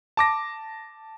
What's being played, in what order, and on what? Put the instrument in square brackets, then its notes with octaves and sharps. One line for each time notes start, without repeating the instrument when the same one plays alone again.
[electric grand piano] A5 D6 A#6